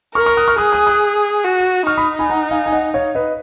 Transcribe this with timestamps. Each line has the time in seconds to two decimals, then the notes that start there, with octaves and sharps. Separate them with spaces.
0.15 A#4 C#6 F6
0.26 C#6 F6
0.37 D#6 F#6
0.48 C#6 F6
0.58 G#4 D#6 F#6
0.72 D#6 F#6
0.87 D#6 F#6
1.45 F#4
1.87 D#4 C#6 F6
1.98 B5 D#6
2.19 G#5 B5
2.30 F#5 A#5
2.51 F5 G#5
2.66 G#5
2.72 D#5 F#5
2.94 C#5 F5
3.15 B4 D#5